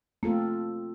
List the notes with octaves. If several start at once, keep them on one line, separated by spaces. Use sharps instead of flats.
A3 A#3 C4 F4 A4